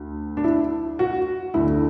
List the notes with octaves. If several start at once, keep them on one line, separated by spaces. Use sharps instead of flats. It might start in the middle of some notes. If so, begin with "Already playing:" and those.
Already playing: D2
D4
E4
F#4
D2 D3 E4